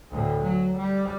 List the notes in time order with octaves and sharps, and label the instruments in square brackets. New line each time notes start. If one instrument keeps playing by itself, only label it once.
[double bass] D2 A2
F#3
G3